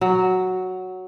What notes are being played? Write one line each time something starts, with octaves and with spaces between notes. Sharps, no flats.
F#3